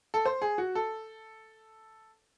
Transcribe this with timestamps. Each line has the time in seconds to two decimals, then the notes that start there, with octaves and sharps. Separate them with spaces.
0.14 A4
0.25 C5
0.42 G#4
0.58 F#4
0.75 A4